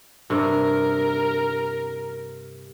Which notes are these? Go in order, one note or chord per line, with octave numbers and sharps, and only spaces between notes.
G2 C3 A#4